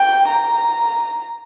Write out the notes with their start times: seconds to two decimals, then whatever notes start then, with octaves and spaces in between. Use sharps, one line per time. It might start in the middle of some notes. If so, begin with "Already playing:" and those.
Already playing: G5
0.28 A#5